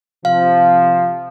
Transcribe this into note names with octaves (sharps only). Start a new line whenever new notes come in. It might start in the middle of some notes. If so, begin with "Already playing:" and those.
C3 F3 F5